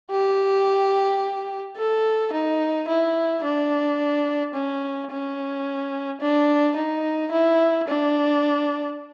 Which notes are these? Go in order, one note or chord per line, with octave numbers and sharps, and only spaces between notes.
G4
A4
D#4
E4
D4
C#4
C#4
D4
D#4
E4
D4